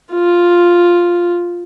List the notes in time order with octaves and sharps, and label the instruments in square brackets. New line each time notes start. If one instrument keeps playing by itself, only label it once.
[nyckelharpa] F4